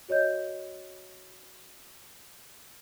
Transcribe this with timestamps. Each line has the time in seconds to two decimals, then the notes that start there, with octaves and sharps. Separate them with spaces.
0.09 F#4 C#5 D#5 G6